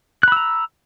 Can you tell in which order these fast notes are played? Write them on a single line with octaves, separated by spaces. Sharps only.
F#6 B5 E6 A#5